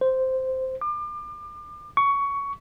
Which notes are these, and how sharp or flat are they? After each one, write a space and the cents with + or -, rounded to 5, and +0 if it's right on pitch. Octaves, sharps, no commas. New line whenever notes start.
C5 -5
D6 +35
C#6 +15